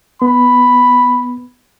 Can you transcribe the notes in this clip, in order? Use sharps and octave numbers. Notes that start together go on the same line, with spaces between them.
B3 B5